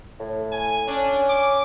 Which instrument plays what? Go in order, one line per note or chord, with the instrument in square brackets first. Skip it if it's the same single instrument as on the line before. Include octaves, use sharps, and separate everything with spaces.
[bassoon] A2
[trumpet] G#5
[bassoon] C#4 [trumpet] D4
[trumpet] D6